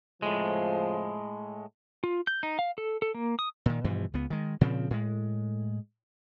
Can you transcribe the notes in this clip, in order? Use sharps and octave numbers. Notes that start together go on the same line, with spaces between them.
F2 A2 C#3 F3 G#3
F4
G6
D#4
F5
A4
A4
A#3
D#6
A#2 D#3
G2 B2 E3 F3
C#2 B3
D#3 G#3
A#2 C#3 F3 C4
A2 G#3